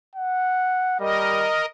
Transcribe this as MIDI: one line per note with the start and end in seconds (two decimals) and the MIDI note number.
0.15 0.95 78
1.00 1.49 55
1.00 1.66 70
1.00 1.66 75